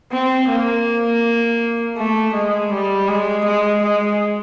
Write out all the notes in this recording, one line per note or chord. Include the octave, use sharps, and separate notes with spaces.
C4
A#3
A3
G#3
G3
G#3
G#3
G#3